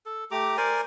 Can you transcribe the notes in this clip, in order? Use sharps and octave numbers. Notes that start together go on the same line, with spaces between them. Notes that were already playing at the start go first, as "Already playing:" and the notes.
A4
A3 G4 A#5 D6
A#4 C5 D5 G#5